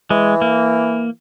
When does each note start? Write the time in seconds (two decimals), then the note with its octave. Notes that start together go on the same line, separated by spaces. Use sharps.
0.10 E3 G#3
0.42 A#3